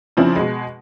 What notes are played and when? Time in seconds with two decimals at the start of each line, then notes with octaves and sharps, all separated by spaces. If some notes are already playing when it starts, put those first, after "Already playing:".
0.17 C#3 F3 C4 D4 E4
0.36 B2 G#3